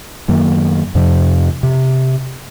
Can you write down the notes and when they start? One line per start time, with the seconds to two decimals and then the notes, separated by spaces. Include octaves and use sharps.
0.28 F#2 D#3 F#3 A#3
0.95 F2 C3 F3
1.63 C3